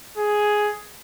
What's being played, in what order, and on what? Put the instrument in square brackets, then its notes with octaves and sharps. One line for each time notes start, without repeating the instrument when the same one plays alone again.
[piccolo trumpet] G#4